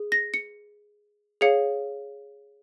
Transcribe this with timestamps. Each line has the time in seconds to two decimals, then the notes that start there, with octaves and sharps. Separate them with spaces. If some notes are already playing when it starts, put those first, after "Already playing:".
Already playing: G#4
0.12 A#6
0.34 C#7
1.41 G#4 C#5 F5 C#7